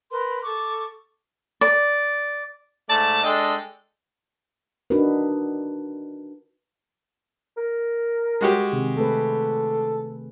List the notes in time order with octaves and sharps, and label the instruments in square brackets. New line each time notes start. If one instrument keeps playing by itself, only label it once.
[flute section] A#4 B4 C6
A4 C#6 D6
[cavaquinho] D5
[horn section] G#2 A3 D5 A5
G#3 D4 A4 D#5 G5
[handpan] D4 D#4 F#4 A#4 B4
[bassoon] A#4
[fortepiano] G#3 F#4 G4
[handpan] C3 D#3 G#4
[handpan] A3 G#4 B4 [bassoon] A4